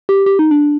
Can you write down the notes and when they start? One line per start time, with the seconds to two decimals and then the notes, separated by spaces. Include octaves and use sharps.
0.09 G4
0.26 G4
0.39 D#4
0.51 D4